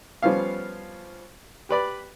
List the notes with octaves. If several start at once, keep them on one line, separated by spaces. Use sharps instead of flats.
F3 G3 B3 C#4 F5
G4 B4 D5 B5